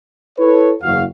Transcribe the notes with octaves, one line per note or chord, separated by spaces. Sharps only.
E4 A4 B4 C#5
F#1 E2 F#4 F5